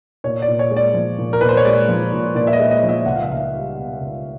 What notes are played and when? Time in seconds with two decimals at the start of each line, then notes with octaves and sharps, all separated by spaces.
0.24 A#2 C#5
0.42 D5
0.48 A#2
0.59 C#5
0.71 G#3
0.77 D5
0.94 F3
1.18 A#2
1.33 A#4
1.41 A#2 B4
1.49 C5
1.57 C#5
1.65 G#3 D5
1.88 F3
2.12 A#2
2.35 A#2 D5
2.47 E5
2.53 D#5
2.59 G#3
2.71 D#5
2.83 F3
2.89 E5
3.06 C#2 F#5
3.15 F5
3.23 E5
3.30 C#2 F5
3.54 G3
3.77 B2
4.01 C#2